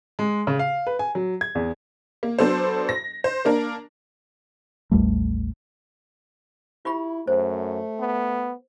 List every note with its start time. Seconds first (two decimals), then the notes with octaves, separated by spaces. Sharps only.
0.19 G#3
0.47 C#3
0.59 F5
0.87 B4
0.99 G#5
1.15 F#3
1.41 G#6
1.55 E2
2.23 A#3
2.39 F#3 B3 D4 A4 C5
2.89 A#6
3.24 C5
3.45 A#3 D4 A#4
4.91 A1 D#2 G3 A3
6.85 E4 F4 G4 B5
7.27 F#2 A3 C5
8.00 B3